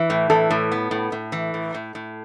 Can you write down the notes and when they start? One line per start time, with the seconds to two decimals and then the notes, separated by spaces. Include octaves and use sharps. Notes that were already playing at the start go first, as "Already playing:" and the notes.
Already playing: E3
0.10 A2
0.30 E3 A4
0.51 A2
0.72 B3
0.91 A2
1.12 A2
1.32 E3
1.54 A2
1.74 A2
1.95 A2